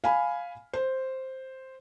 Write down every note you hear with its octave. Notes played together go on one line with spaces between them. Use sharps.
F5 G#5 B5
C5